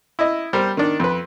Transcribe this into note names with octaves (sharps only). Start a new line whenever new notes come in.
E4 D#5
G3 A#4 C5
D#3 D4
F2 B4